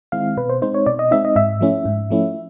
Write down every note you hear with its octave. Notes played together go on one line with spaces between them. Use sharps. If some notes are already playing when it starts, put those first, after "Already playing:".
D#3 G#3 C4 E4 F5
B2 B4
C5
G#3 C4 D#4 C5
C#5
B2 D5
D#5
G#3 C4 D#4 E5
D#5
G#2 E5
F3 A3 C#4 E4
G#2
F3 A3 C#4 E4